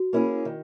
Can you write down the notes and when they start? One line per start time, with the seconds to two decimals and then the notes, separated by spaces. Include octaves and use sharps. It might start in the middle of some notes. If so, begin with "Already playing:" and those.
Already playing: F#4
0.13 A#3 C#4 E4 G#4
0.45 D#3